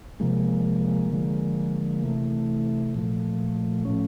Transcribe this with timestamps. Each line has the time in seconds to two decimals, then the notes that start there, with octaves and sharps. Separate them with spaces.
0.20 C3 F3 G#3 A#3
1.11 D3 F3 G#3
2.03 C3 E3 A3
2.94 A#2 F3 A3
3.85 A2 F3 A3 C#4